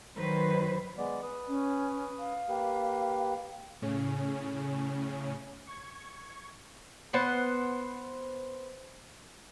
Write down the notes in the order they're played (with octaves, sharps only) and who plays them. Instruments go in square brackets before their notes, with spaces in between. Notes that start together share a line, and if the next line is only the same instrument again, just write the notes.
[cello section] D#3 F#3 B4 C5
[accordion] G#3 B3 D5
B4 D#6
[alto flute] C#4
F5
[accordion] A#3 G4 B4
[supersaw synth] A2 C#3 C#4
C#6 G#6
[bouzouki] B3 C5 F#5